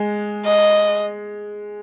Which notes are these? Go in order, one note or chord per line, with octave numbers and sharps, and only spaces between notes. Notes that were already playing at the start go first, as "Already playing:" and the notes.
Already playing: G#3
D#5